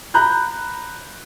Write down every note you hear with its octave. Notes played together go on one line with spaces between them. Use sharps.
A#5 B5 F#6 G6